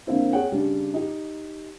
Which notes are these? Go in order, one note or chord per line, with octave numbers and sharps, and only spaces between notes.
D3 A#3 C4 E4
G#4 C#5 F#5 G5
C#3 G3 D4
D#4 G4